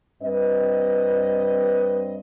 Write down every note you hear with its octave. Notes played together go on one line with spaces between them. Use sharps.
G2 C4 B4 D#5